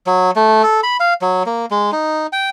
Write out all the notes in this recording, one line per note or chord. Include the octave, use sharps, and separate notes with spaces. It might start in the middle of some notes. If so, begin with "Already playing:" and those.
F#3
A3
A4
B5
F5
F#3
A#3
G#3
D#4
G5